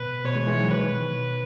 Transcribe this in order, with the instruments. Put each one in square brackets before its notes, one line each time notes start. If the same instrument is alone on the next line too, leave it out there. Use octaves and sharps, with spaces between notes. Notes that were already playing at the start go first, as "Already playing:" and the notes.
Already playing: [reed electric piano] B2 [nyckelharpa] B4
[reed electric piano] B2 [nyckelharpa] C#5
[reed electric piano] E3 G#3
E3 G#3
D#3 F#3
[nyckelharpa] B4
[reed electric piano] B2 D#3